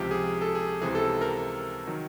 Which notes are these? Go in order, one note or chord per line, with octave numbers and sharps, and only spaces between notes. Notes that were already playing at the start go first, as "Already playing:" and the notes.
Already playing: C#2 C3 F3 G4
G#4
A4
G#4
C#2 C3 E3 G#4
A4
A#4
D#3 F#3